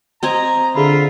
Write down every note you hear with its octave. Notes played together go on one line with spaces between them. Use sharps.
C4 D#5 G#5 A#5
D3 F4 G#4 E5 B5